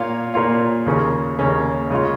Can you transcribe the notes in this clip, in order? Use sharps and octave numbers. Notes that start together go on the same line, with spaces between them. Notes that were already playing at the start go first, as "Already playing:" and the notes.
Already playing: A#2 A#3 F4 C#5 F5
A#2 A#3 F4 C#5 F5
D#2 C#3 A#3 C#4
D#2 C#3 A#3 C#4
C#3 G#3 C#4 F4